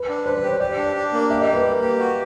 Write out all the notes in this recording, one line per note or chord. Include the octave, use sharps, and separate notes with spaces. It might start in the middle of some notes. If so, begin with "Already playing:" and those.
Already playing: B4
D4
B4 C5
C5
G4
C#5
G4 D5
D4
D4
A#3
G4 E5
D#5
A#3
B4
A#3
G4
F#4